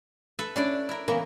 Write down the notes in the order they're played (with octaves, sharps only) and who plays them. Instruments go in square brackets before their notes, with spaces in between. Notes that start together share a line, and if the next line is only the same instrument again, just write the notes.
[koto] A4 B4 E5
[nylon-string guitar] C#4 [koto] D4 E4 D5
[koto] E4 A#4
[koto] C#3 E3 A#3 [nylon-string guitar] B3 A#4